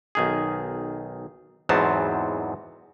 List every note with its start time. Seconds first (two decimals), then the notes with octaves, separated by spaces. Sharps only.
0.15 B1 D#3 G#4
1.69 E2 G#2 F#3 B3 C4 A5